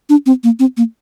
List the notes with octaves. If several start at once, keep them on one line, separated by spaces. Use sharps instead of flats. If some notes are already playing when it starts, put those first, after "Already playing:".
D4
C4
A#3
C4
A#3